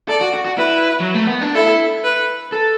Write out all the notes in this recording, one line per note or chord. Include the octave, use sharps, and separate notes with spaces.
A4 D5
F#4
F#4
F#4
E4 B4
F#3
A3
B3
D4
E4 A4
B4
A4